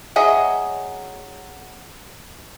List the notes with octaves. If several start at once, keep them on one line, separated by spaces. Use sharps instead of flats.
F#3 F#4 G#4 D#5 E5